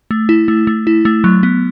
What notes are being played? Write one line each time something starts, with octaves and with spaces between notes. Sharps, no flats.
A3
E4
A3
A3
E4
A3
F#3
B3